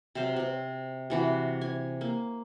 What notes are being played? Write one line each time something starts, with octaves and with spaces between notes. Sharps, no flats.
C3 F#3 C5 F5
C3 C4
C3 E3 F#4
G#5
A#3